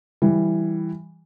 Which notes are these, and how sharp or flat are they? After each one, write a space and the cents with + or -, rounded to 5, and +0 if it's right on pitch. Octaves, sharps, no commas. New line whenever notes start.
E3 +0 G3 +0 G4 +0